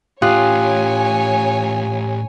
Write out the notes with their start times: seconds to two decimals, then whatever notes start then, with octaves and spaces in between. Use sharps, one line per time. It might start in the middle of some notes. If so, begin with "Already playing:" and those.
0.22 A2 C#4 F4 G4 C#5 G#5 D#6 F#6